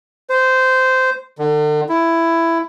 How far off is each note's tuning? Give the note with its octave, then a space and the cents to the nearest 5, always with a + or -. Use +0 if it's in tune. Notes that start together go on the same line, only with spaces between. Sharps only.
C5 -15
D3 +40
E4 +10